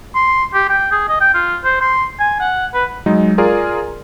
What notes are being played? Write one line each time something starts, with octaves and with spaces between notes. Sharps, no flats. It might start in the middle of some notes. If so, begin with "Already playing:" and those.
C6
G4
G5
G#4
D#5
G5
F4
C5
C6
G#5
F#5
B4
F#3 G#3 D#4
F4 G#4 A#4 D5